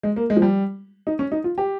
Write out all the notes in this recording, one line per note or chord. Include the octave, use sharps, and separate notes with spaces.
G#3
A#3
G#3
F3
G3
D#4
C#4
D#4
F4
G4